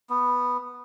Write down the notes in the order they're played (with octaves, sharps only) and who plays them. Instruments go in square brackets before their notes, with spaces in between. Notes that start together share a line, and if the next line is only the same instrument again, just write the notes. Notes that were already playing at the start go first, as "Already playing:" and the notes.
[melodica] B3